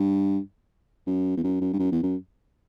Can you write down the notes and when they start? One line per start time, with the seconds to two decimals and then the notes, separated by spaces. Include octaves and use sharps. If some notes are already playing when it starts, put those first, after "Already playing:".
Already playing: G2
1.07 F#2
1.37 E2
1.43 F#2
1.61 F#2
1.73 G2
1.79 F#2
1.92 E2
2.03 F#2